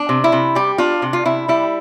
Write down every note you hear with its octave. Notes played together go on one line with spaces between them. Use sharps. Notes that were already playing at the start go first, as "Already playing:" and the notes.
Already playing: D4
C3
E4
C3
G3 G4
D4 F4
C3
F4
C3 E4
G3 E4